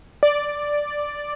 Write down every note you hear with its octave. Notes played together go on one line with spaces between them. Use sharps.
D5